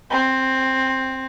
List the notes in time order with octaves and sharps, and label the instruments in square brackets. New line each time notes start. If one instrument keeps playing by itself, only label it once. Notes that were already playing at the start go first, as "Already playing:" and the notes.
[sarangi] C4